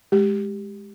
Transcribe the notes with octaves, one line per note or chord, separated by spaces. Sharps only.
G#3 G4